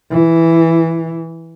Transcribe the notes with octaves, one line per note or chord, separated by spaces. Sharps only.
E3